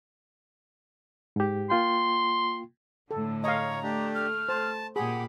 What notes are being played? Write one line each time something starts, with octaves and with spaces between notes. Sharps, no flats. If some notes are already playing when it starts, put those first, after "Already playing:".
G#2 G4
A#3 F4 G5 C6
A2 D3 A4
C#5 D#5 F5 A#5
A3 D4 G4
F6
C5 A5
A#2 G4 G#4 F#5 B5